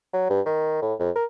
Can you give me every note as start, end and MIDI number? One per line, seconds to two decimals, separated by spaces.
0.13 0.30 54
0.30 0.41 43
0.46 0.80 51
0.82 0.94 45
0.99 1.10 41
1.16 1.25 70